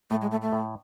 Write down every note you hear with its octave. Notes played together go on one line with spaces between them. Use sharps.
A2 A3
G#3
A3
A3
A2